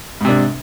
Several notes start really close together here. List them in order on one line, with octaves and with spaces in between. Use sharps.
G#2 C3 D4